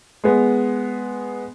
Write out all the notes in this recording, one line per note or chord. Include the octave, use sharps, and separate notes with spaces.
G#3 B3